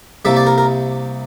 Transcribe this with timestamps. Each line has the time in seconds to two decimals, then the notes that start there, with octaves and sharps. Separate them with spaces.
0.25 C2 C3 G3 A#3 E5
0.37 D5
0.47 A#4
0.58 A#4